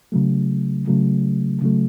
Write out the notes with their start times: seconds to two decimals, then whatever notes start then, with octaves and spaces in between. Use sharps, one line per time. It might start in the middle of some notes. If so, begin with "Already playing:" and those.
0.12 C#3 F#3 A3
0.88 C#3 F#3 A3
1.62 C#3 F#3 A3